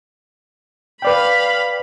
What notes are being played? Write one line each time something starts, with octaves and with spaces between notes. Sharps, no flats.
B4 D5 F5 G5 B5